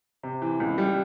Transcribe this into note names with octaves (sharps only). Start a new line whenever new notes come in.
C3
E3
C#2
G3